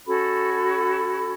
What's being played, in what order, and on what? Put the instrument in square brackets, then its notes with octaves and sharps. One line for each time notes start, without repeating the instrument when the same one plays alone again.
[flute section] C#4 F#4 A4 B5